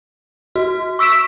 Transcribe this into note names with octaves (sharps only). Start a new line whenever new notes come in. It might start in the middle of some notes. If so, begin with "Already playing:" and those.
F#4
C#6 E6 B6 D7 E7